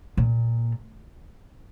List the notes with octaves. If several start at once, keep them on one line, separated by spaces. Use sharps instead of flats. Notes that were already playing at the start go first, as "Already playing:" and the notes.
A#2